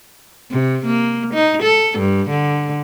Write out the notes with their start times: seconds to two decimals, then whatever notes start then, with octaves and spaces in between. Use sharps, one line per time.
0.51 C3
0.86 A#3
1.34 D#4
1.63 A4
1.99 G2
2.30 D3